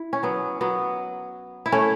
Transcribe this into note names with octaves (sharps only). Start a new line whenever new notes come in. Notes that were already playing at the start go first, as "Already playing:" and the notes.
Already playing: E4
C#4
F#3 B3
F#3 B3
E4
A3 C#4